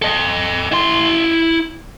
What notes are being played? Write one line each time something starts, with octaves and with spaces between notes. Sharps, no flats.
A4 D#5
E4 C6